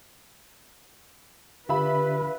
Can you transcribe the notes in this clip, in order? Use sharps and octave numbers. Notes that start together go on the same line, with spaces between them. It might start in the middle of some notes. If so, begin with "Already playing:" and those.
D3 F4 G4 B4 E5 B5